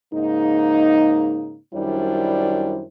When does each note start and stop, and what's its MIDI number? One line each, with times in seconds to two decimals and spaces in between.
0.13 1.57 44
0.13 1.57 49
0.13 1.57 58
0.13 1.57 63
1.74 2.84 42
1.74 2.84 51
1.74 2.84 55
1.74 2.84 62
1.74 2.84 64
1.74 2.84 72